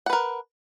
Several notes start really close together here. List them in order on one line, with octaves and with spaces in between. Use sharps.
F#5 B4 A#4